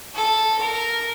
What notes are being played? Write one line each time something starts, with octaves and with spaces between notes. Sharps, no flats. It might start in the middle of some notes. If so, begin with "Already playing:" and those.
A4
A#4